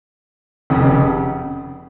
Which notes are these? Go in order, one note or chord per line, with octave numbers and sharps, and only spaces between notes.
F1 F2 C#3